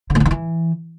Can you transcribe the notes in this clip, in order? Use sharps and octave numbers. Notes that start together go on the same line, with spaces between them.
D3
A2
D3
D#3
E3